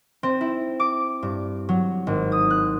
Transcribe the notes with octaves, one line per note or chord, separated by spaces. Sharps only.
C4
E4
D6
G2
F#3
G#1
D#6
F#6